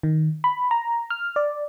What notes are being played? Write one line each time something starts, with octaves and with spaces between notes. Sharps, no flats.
D#3
B5
A#5
F6
D5